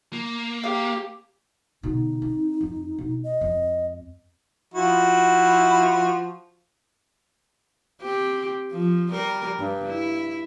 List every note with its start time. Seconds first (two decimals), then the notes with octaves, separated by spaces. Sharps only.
0.13 A#3
0.64 G4 F5
1.83 B2 D3 D#4
2.22 C4
2.61 F2
2.98 B2
3.24 D#5
3.41 F2 G#3
4.74 F3 E4 F#4
8.02 C4 G4
8.72 F3
9.11 G3 A#4
9.59 G2
9.88 E4